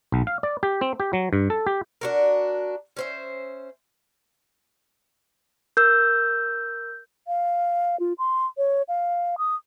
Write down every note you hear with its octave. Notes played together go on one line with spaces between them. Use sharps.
B1
F5
D5
G4
C4
G4
F#3
G2
A4
G4
D4 F#4 A#4
C#4 C5 E5
A#4 E6 G6
F5
F4
C6
C#5
F5
D#6